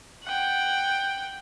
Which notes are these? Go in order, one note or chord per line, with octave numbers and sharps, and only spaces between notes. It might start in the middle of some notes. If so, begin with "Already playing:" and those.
F#5 G5